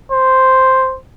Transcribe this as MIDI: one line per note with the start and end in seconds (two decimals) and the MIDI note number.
0.12 0.97 72